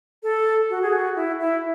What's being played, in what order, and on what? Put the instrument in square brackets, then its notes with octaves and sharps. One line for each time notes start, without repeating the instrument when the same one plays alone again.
[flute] A4
F#4
G#4
F#4
E4
E4